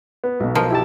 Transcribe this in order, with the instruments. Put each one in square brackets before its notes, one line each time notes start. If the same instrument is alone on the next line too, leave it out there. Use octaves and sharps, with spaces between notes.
[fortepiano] B3
[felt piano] B1 B2
[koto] F3 [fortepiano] A#4
[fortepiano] E4 G4 A5